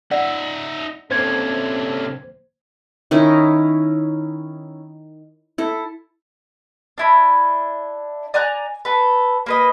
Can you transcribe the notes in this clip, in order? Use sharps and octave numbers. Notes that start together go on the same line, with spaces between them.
D#4 D5 E5 F#5
C3 A#3 C#4 D4 A4 C5 G#6
D#3 C#4 D#4 E4
E4 A4
D4 E4 B5
D5 G#5 A#5 F#6
A4 B4
A#3 B4 D#5